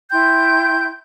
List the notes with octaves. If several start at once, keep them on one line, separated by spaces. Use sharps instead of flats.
E4 G5 C6 G6